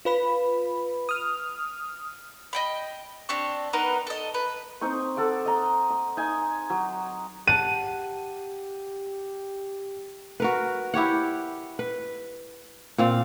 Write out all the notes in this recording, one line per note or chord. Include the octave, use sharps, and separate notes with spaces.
F4 B4 B5
D#6 F6
D#5 G5 B5
C4 D4 G4 C#6
B3 D#4 A#4 B4
A4 D#5
B4
C4 D#4 C#6
A4 F#5 D6
D#5 A#5
D#6
D#4 G#5
F#3
G4 F#5 A5 D#7
F#4 A#4 B4
E4 G4 C#5 F#5
B4
A#2 C4 F5